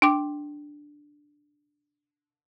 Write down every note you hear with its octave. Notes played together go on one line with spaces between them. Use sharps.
D4 G5 D6